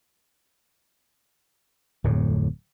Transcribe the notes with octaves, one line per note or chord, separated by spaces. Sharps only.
D1 F2 A2